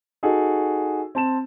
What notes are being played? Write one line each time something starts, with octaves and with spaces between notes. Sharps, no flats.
D#4 F#4 G#4 A4
C4 A5 E7